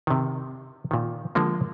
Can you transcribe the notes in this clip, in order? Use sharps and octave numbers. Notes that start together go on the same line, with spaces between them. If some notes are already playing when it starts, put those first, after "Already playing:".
C3 D#3
A#2 D#3
D3 F3 G#3 A#3